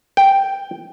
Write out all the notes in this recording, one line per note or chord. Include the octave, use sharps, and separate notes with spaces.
G5